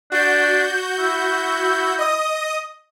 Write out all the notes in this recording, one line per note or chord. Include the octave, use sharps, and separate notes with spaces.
D4 F#4 G6
E4
D#5 D#6